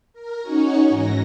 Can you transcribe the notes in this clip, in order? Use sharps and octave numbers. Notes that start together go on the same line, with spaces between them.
A#4
C#4 D#4 F#4 C#5
G#2 E3 A#6